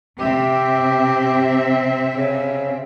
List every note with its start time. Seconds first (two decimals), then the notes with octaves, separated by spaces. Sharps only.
0.20 C3 C4 G4 E5
2.16 C#3